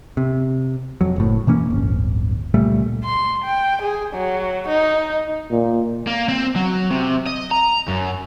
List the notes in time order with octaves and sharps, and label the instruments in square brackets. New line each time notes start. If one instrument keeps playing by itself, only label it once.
[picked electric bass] C3
F2 F#3
F#1 A2
B2 E3 A#3 C#4
D1 G1
C#2 A#2 G3 A3
[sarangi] C6
G5
G#4
F#3
D#4
[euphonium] A#2
[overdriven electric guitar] A#3
C4
F#3
C3
D#5
A#5
F#2